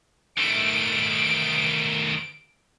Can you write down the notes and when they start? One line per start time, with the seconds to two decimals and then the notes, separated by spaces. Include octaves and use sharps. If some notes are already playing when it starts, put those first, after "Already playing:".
0.38 D#3 A3 D7